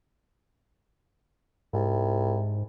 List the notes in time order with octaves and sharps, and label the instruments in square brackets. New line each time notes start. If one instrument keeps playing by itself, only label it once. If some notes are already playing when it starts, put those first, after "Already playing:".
[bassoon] C2 [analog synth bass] G#2